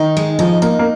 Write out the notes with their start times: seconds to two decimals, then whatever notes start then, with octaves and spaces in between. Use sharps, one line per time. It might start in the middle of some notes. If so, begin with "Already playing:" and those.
Already playing: D#3 D#4
0.17 G#3
0.39 F3 D#4
0.62 A#3 D#4
0.79 A#3